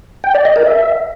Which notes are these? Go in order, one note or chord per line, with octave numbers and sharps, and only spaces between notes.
G5
D5
D#5
A#4
E5